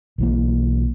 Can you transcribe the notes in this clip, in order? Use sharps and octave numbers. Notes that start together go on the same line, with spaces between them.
B1 E3 A#3